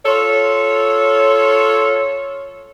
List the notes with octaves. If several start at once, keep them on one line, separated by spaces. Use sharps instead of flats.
F4 A4 C#5